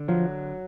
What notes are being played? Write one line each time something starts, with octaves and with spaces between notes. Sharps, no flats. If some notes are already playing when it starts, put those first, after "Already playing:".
Already playing: D3
F3 F#3